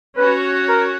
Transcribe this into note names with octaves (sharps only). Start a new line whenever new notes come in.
C#4 F#4 B4 C#5
A#4